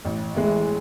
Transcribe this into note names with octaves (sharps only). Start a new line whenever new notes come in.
A1
A2 E3 G#3